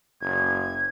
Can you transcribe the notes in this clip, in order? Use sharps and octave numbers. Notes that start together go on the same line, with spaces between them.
F#1 G#6